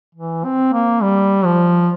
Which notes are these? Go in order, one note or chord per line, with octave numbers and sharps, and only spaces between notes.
E3
C4
A#3
G3
F3